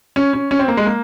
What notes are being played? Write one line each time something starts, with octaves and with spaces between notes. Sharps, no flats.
C#4
C#4
C#4
C4
A#3
G#3
A#3